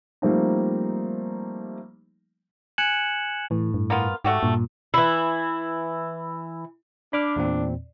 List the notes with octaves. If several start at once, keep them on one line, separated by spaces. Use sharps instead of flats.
F3 G3 A3 A#3 C4 D#4
G#5 F#6 G#6 C#7 E7 F#7
A2 E3
G2
A#3 B3 F4
G#2 A3 F#4 G4
G2 A#2
E3 E4
D4 D5 B5 D6 F6
E2 A#2 C4